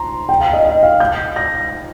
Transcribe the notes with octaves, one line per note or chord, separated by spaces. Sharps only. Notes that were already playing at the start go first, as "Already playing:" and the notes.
Already playing: A#5 C6
G5
F5
D#5
D#5
F5
G6
A#6